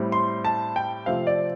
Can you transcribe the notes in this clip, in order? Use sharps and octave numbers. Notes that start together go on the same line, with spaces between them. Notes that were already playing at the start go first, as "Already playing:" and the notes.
Already playing: A2 G3 C4
C6
A5
G5
C3 F3 A3 C4 F5
D5